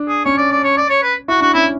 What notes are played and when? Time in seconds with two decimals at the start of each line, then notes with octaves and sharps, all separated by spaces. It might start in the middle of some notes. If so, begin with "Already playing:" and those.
Already playing: D4
0.08 G#4
0.25 C#4 C#5
0.38 D5
0.52 D5
0.64 C#5
0.77 D5
0.90 C#5
1.03 B4
1.28 E4 F#4
1.41 D4 F#4
1.54 C#4 E4